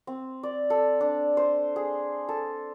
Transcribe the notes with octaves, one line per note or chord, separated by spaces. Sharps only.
C4
D5
A4
D4
C5
G#4
A4